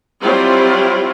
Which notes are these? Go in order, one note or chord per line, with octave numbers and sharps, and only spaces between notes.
F#3 G3 C4 E4 F4